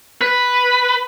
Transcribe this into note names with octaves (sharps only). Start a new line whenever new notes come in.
B4